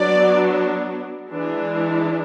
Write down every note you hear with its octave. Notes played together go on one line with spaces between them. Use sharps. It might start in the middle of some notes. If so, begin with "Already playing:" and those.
Already playing: F#3 B3 D4 D5
E3 G#3 D4